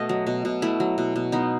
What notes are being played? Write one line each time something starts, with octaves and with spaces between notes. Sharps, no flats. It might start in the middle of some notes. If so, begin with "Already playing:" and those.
Already playing: B2 A3 D#5
F#3
B2
B2
A3 E4
F#3
B2
B2
B3 D#4